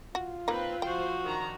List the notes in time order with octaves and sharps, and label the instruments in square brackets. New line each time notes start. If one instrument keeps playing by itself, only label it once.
[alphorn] F4 [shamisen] F#4
[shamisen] A#3 D#4 [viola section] C4 B4
[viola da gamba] F3 F#4 [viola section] C5 [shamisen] G5
[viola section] D#3 D4 A#5